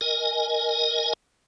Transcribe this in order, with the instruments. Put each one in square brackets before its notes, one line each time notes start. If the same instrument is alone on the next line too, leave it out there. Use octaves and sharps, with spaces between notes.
[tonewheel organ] A#4 D#5 G#5